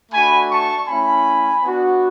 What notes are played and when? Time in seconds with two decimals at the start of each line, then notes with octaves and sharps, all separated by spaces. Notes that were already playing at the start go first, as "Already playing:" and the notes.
0.12 A3 D4 F#4 G#5 B5
0.50 A5 C#6
0.87 A3 C#4 E4 G#5 B5
1.64 B3 D4 F#4